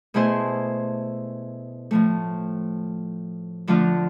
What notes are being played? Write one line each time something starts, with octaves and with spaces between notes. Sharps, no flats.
B2 A3 E4 G#4 C5
A2 F3 A3
D3 F3 A3 D4 F4